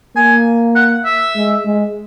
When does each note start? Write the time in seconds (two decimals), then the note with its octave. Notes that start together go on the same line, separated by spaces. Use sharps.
0.16 A#3 G#5
0.75 F#5
1.05 E5
1.36 G#3
1.65 G#3